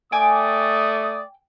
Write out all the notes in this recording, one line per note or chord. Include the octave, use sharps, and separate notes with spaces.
A3 D5 G5 G#5 D6 D#6